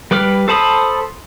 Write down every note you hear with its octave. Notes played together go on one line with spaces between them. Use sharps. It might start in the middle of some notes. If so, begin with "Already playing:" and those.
G3 B4 D6 F6
A4 C5 A5 B5 D#6